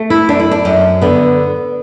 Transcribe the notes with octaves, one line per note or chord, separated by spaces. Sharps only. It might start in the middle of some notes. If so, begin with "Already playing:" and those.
Already playing: A3
E4
F#2 D4
E4
D4
F#2
D3 B3